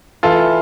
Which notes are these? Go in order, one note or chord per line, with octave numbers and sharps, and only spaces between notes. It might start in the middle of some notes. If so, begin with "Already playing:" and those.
E3 F4 A4